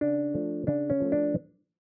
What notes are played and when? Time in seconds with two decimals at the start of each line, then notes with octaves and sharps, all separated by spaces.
0.01 C#3 D4
0.34 F3 A3
0.67 C#3 D4
0.90 C#4
1.00 F3 A3
1.12 D4